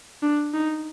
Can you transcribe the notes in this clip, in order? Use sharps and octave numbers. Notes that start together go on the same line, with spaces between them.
D4
D#4